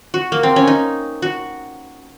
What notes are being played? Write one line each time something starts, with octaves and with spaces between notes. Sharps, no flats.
F#4
A#3
C4
C#4
D#4
F#4